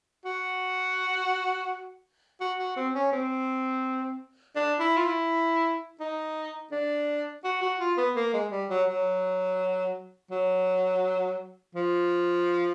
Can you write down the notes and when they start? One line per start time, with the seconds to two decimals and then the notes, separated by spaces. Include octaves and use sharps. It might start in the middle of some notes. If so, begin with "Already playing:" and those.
0.25 F#4
2.40 F#4
2.59 F#4
2.76 C4
2.95 C#4
3.12 C4
4.56 D4
4.80 E4
4.97 F4
5.04 E4
6.00 D#4
6.72 D4
7.44 F#4
7.62 F#4
7.80 F4
7.97 B3
8.16 A#3
8.34 G#3
8.51 G3
8.70 F#3
8.88 F#3
10.31 F#3
11.75 F3